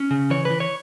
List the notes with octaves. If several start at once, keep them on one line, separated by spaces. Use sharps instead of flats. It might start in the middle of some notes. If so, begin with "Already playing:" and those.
Already playing: C#4
C#3
E3 C#5
B4
E3
C#5